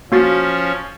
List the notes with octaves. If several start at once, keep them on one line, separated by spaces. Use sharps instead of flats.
F3 A#3 C#4 F#4 A6